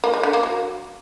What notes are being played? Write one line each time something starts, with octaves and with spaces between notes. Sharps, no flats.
A#3
G#3
D3
A#3
F#3